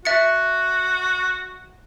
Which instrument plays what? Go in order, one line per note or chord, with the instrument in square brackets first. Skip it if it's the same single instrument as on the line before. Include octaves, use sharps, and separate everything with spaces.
[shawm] F#4 [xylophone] E5 A6 C#7